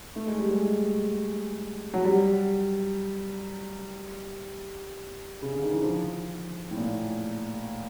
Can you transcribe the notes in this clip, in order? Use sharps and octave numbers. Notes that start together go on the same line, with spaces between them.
A3
G#3
G3
G#3
F#3
G3
C#3
D3
D#3
E3
F3
A2
A#2